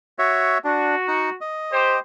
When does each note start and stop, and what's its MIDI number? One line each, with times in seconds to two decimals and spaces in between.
0.19 0.58 66
0.19 0.58 73
0.19 0.58 76
0.64 0.95 62
0.64 1.36 66
1.08 1.30 63
1.08 1.30 78
1.41 2.00 75
1.72 1.96 67
1.72 1.96 72